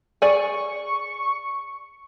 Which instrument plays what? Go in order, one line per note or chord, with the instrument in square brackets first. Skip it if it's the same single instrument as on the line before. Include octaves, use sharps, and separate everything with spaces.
[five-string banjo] G#4 D5 G#5 [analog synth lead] C#6